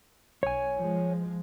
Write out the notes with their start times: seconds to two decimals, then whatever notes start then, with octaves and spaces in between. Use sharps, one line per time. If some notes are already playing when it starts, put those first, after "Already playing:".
0.43 B1 C#5 G#5
0.77 F3 G#3